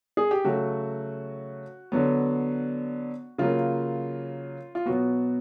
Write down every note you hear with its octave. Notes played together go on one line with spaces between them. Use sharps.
G#4
G4
C#3 F#3 A3 F#4
D3 F#3 B3
C#3 F#3 A#3 F4
F4
B2 F#3 B3 F#4